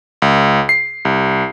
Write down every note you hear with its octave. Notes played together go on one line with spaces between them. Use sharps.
C#2
C7
C2